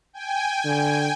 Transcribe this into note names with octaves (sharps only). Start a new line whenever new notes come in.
G5 G#5
D3